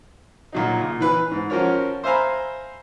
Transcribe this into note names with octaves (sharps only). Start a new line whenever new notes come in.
A#2 F#3 D#4
A#2
E3 B4
G#2
F3 C#4 F#4 A#4 C#5
C5 E5 F5 G#5 A#5 B5